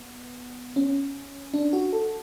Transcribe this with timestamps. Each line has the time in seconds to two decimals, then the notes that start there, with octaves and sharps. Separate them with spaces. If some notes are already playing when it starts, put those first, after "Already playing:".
Already playing: B3
0.76 C#4
1.54 D4
1.73 F#4
1.93 A4